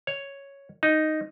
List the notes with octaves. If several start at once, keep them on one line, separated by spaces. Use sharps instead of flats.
C#5
D#4